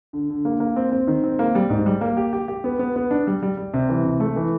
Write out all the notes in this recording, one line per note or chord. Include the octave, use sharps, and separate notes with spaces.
D3
D3
A#3
A#3
C4
C4
D#3
C4
A#3
G3
G#2
G3
A#3
G4
G4
G4
B3
B3
B3
D4
G3
G3
G3
C3
E3
C3
A3
E3